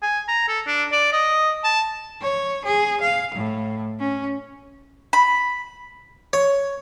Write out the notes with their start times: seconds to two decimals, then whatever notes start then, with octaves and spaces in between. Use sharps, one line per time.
0.02 G#5
0.28 A#5
0.48 A4
0.67 D4
0.92 D5
1.13 D#5
1.64 A5
2.22 C#5
2.65 G#4
3.01 F5
3.35 A2
4.00 C#4
5.13 B5
6.33 C#5